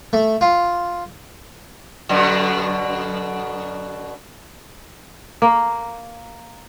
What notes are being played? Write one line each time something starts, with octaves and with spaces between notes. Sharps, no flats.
A3
F4
F#2 B2 D3
A#3